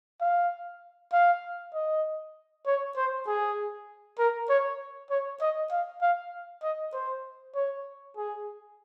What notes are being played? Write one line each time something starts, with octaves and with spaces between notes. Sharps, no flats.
F5
F5
D#5
C#5
C5
G#4
A#4
C#5
C#5
D#5
F5
F5
D#5
C5
C#5
G#4